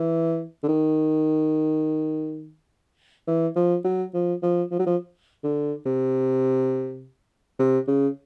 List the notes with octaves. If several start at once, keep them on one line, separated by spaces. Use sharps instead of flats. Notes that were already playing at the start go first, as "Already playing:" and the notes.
Already playing: E3
D3
D#3
E3
F3
F#3
F3
F3
F3
F#3
F3
D3
C3
C3
C#3